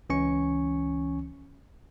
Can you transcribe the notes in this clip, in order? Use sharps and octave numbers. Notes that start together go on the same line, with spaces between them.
C#2 E3 C#4 G#5 C#6 C#7